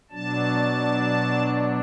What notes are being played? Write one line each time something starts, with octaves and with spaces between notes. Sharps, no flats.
B2 F#3 D4 A5